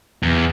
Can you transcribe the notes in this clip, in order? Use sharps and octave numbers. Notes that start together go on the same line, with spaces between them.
E2